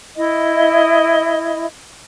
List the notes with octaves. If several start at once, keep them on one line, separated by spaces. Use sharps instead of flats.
E4 D#5